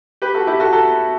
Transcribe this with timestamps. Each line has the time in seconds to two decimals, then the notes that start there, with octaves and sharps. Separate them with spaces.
0.22 G4 B4
0.34 F#4 A4
0.47 E4 G4
0.60 F#4 A4
0.73 F#4 A4